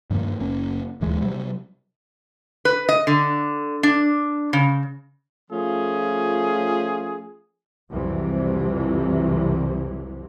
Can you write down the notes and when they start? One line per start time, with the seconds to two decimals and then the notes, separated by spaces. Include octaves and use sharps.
0.10 G2 D#3 F3 A#3
0.39 F#1 A#3 C#4
1.01 D1 D#2 E3 G#3
1.21 C3 F#3 G3
2.65 B4
2.89 D#5
3.07 D3
3.83 D4
4.53 C#3
5.51 F3 A3 C#4 F4 G#4
7.91 C2 F2 C3 E3 F#3